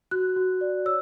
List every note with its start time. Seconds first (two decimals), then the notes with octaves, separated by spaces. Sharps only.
0.11 F#4 F#6
0.36 F#4
0.61 D5
0.85 C#5 E6